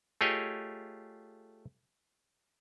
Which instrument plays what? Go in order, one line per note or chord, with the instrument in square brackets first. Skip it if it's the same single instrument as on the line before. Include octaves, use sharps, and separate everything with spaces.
[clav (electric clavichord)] A3 F4 G4 G#4 C#5 D#5